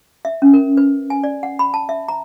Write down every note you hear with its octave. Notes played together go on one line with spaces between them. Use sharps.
E5
C#4
A#4
B4
G#5
D5
F#5
B5
A5
E5
A#5